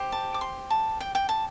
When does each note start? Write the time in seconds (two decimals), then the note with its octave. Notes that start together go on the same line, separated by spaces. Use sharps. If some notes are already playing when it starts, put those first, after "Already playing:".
Already playing: G4 C5
0.12 A5
0.34 D6
0.41 C6
0.70 A5
1.00 G5
1.15 G5
1.29 A5